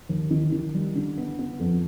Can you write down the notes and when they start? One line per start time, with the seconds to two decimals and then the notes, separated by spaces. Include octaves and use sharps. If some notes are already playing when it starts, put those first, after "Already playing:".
0.09 D#2
0.31 D#3
0.52 D#3
0.74 G3
0.95 D3
1.18 B3
1.39 B3
1.60 F2